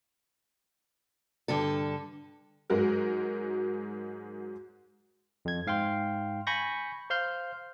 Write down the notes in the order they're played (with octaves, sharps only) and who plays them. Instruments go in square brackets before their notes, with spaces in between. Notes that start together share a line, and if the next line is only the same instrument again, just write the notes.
[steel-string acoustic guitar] G2 D3 A4
[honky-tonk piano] G#2 F#3 G#3 F#4 A#4
[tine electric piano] F2 G#6
G#2 F5 G5 C6
G#5 B5 C#6 G6 A#6
C5 F5 C6 F6 G6